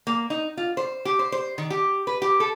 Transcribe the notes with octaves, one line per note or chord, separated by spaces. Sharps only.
A#3
D#4
F4
C5
G4
C5
C5
D#3
G4
B4
G4
A4